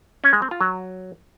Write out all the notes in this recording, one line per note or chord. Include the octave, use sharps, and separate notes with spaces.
C#4
G#3
C4
F4
F#3